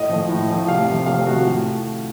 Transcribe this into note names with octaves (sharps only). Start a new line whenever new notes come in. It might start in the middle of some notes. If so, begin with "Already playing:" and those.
Already playing: A2 D#5
F3 A3
A2
F3 A3
C3 F5
F3 A3
C3 F5
F3 A3 F#4
A2